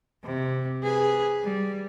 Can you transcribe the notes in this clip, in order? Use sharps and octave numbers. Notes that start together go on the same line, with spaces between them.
C3
G#4 B4
G3